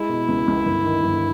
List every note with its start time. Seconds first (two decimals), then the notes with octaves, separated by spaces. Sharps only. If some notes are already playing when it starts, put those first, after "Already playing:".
Already playing: G#3 E4
0.09 B2
0.28 C#2
0.48 C#2
0.65 G1
0.84 D#3
1.03 G1